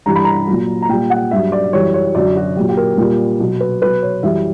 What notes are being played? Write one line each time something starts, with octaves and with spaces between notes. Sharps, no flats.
G2 E3 G3 A#5
B5
A#5
F#3
A#2
A#5
A#2 G3 G5
F#5
G2 F#3 E5
D5
F#2 E3 G3 C#5
C#5
F#2 D3 F#3 D5
F#4
A#2 F#3 G4
G4
A#4
A#2 G3
B2 F#3
B4
B2 F#3 B4
C#5
F#2 E3 G3 E5